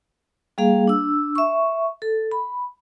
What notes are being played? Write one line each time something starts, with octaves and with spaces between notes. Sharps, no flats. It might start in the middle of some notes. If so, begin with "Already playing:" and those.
G3 A#3 G#4 F5
D4 E6
E5 C#6
A4
B5